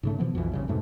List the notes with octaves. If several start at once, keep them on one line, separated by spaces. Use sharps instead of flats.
G#2 C#3 A3
B2 E3 F3 B3
B1 F2 B2 E3
A1 C#3 G3
F2 G#2 B2 A3